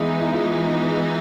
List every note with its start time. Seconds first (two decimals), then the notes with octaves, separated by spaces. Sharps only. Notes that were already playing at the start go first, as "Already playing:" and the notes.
Already playing: E3 G#3 B3 D#4 E4
0.21 E4
0.32 F4